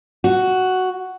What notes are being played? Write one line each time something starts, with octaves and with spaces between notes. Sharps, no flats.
F#4